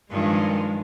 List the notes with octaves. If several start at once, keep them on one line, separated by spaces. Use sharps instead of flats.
G2 D#3 F3 G#3